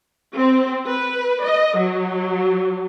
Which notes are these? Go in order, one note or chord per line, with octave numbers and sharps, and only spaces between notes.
C4
B4
D#5
F#3